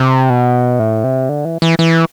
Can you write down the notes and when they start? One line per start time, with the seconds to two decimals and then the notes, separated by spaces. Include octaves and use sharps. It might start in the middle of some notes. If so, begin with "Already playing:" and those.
Already playing: C3
0.30 B2
0.79 A2
1.04 C3
1.29 D3
1.45 E3
1.62 E3
1.79 E3